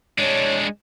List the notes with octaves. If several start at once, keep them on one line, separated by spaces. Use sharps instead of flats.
G#3 D4 C#5